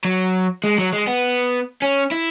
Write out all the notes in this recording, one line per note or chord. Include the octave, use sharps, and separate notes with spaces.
F#3
G#3
F#3
G#3
B3
C#4
E4